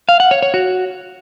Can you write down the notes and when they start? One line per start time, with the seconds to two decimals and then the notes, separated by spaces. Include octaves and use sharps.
0.09 F5
0.20 F#5
0.31 C#5
0.42 C#5
0.54 F#4